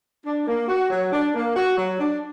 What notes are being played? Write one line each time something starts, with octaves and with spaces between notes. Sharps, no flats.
D4
A#3
F#4
F#3
D4
A#3
F#4
F#3
D4